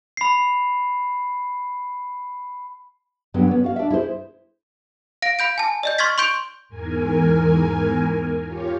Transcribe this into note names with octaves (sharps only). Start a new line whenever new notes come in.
B5 C7
G2 D3 F#3 B3
B3 C#4
F#4 F5
D4 E5
E4 G#4 C5
F5 A#6 D7
F5 B5 G6 D7
G#5 A5
D5 D#5 G6
C6 C#6 F6 G#6 A6 B6
C6 C#6 G6 D7 F7
E2 G#2 A#4 G#5
F4 G4 C#5